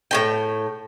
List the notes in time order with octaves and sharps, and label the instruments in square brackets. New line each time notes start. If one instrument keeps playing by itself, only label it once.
[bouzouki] A2 C#3 G5